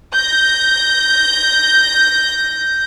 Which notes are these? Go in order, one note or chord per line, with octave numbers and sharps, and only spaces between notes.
G6 A#6